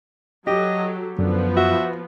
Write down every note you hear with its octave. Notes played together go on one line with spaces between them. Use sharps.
F#3 G4 A4 D#5
F#2 D3 F3 B3
F#4 E5